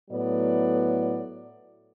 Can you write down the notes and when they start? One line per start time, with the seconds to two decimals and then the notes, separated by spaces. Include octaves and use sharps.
0.10 A2 F#3 B3 D5